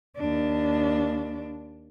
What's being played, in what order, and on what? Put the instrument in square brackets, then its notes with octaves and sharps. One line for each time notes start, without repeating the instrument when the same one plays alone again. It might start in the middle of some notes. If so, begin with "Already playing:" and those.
[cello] D#2 D4